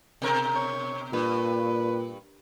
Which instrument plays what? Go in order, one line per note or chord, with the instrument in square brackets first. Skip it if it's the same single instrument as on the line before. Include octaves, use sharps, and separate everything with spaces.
[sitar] B2 A#4
[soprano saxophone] C#5
[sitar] G2 [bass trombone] A#2 [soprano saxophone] B4